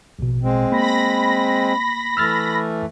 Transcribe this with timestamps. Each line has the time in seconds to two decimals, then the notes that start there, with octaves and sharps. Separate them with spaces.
0.19 A#1 B2
0.43 G#3 C4
0.72 A#3 B5 A#6
2.17 E3 A3 E6 F6 A6